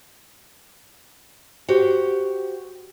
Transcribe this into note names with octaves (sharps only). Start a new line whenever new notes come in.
F#4 G4 C5